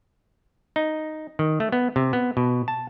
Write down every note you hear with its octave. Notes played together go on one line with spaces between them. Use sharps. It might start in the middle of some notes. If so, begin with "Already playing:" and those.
D#4
D#3
A3
B3
C3
B3
B2
A5